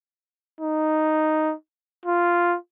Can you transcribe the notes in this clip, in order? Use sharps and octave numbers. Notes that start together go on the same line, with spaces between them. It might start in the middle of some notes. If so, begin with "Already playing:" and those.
D#4
F4